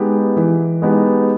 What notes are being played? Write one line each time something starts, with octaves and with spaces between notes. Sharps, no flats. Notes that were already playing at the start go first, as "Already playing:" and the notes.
Already playing: G#3 B3 D#4 G4
E3
G#3 B3 D#4 G4